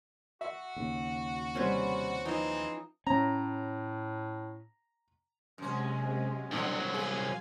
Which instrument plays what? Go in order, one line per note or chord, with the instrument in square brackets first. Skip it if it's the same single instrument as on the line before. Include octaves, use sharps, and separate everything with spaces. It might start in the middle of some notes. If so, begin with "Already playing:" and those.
[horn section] F#4 [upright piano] E5
[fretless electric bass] D#2 C#3
[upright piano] C3 G3 [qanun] C#4 B4 C5
[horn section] E3 G#3 C4 [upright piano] F3 [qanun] D#4
[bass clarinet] A2 [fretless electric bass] C#4 [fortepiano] A#5
[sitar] F#2 C#4 [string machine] C3 G#3
[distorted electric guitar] C2 F#3 [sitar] D3 [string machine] C6
[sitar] G#4 [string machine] F5 G#5 G#6